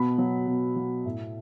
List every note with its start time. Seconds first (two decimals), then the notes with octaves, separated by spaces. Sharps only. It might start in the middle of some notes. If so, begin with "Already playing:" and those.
Already playing: B2 B5
0.18 F#3
0.47 B2
0.76 F#3
1.06 A2